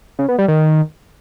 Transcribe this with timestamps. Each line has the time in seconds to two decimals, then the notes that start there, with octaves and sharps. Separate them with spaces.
0.19 C#3
0.29 B3
0.38 G3
0.48 D#3